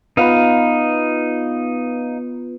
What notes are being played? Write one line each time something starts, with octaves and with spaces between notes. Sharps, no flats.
B3 D#4 F4 B4 F5